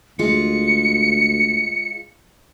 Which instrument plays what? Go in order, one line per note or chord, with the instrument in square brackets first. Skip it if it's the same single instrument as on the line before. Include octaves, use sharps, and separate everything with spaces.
[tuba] D2 [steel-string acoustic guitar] G#3 F4 [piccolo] C#7